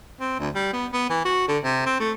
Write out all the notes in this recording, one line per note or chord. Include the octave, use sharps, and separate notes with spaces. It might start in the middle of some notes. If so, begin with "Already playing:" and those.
C4
D2
G3
B3
B3
E3
F#4
D3
C3
C4
A3